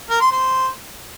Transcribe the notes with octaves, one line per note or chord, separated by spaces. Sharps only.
A#4
C6
C5